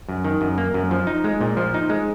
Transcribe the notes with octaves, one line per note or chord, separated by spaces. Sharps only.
F#2
D#3
F#2
A#3
F#2
F3
D#4
G#3
A#2
F3
D#4
G#3